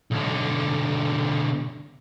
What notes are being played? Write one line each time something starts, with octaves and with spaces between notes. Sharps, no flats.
B1 D3